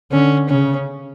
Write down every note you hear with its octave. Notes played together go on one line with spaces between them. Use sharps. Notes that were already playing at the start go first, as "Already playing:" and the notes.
D3 C#4
C#3 C#4